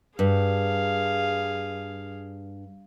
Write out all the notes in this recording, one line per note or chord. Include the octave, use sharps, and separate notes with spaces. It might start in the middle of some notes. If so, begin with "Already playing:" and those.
G2 G#4 F5